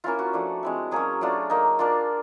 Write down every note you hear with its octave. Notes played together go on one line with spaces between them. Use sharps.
A#3 C#4 E4 F4
F#4
F3 A3 D4
G#3 C4 E4
F#3 A#3 C#4 G#4
F#3 A3 D4 F4
A#3 D#4
A#3 D4 F4